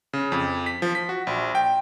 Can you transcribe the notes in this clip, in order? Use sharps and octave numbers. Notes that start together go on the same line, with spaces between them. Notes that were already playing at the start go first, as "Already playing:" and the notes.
C#3
F2
B6
F3
B6
F#4
A#1
G5